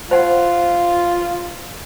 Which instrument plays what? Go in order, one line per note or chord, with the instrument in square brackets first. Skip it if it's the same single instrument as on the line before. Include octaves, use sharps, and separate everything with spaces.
[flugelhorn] F4 [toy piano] C5 F#5